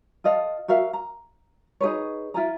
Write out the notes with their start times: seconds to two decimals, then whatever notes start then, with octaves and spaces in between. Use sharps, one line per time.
0.24 F4 A4 D#5 F5
0.68 F#4 A#4 E5 F5
0.93 A#5
1.81 D#4 G#4 B4 C#5
2.34 E4 F4 G#5 A#5